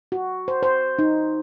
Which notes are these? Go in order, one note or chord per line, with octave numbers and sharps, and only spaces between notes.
F#4
C5
C5
D#4